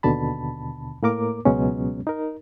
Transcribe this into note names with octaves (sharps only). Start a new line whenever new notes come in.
D#2 B2 D3 A5 B5
A2 A#3 A#4 D6
C#2 B2 F#3 G#3 B3 C#4
D#4 A#4